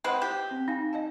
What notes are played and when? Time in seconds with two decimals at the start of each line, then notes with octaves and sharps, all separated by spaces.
0.04 G#3 C4 B4 C5 F#5
0.22 G4
0.51 C4
0.68 D#4 F5 G#5
0.93 D#5 F5 A5